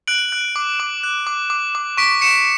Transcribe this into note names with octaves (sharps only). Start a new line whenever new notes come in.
F#6 D7 F#7
F#6
D6
D6
F#6
D6
D6
D6
C#6 B6 D7
C#6 C#7 E7